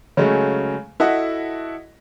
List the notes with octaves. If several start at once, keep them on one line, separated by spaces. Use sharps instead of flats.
C#3 F#3 G#3 A3 C#4
E4 F#4 A4 D#5 E5 F#5